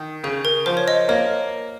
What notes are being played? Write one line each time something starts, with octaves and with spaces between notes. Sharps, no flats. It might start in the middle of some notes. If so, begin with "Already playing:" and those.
Already playing: D#3 A#4
C#3 G#4
A#4
F3 C5
C#5
D#5
A#3 C#5